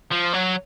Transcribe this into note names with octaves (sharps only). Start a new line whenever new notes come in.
F3
F#3